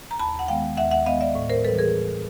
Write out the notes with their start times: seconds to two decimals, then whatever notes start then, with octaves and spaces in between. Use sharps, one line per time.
0.11 A#5
0.19 D#2 A5 B5
0.39 F#5
0.48 D#3 G#3 B3 F5 G5
0.77 D#2 E5 F#5
0.91 E5 F#5
1.06 D#3 G#3 B3 D#5 F5
1.21 D5 E5
1.35 A2
1.50 A#4 C5
1.64 G3 A4 B4
1.68 E3
1.78 G#4 A#4
1.94 A2